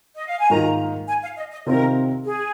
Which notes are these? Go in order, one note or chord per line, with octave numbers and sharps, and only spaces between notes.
D#5
F5
G#5
G#2 D#3 A#3 F4 A#5
G#5
F5
D#5
D#5
C3 D#3 C4 F4 A#4
G#4